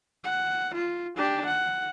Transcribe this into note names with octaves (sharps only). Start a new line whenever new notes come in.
F#5
F4
D4 G4
F#5